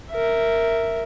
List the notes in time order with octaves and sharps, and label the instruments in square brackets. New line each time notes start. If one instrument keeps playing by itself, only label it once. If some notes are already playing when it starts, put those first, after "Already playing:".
[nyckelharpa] A#4 E5